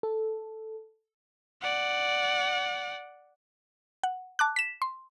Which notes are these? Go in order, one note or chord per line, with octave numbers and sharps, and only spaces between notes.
A4
D5 F#5
F#5
A5 D6 F#6
B6 E7
C6